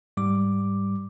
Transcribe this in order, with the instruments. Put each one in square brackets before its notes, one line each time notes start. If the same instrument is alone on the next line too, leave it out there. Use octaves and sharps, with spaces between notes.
[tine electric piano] G#2 G3 D6